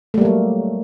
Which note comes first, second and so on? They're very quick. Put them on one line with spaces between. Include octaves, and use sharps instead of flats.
A3 G3 A#3 F#3